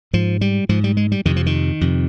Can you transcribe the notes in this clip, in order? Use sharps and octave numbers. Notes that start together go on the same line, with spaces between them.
G#2 F3
G3
G#2 F3
G3
G#3
G3
F2 C3 D#3
F3
D#3
F2 C3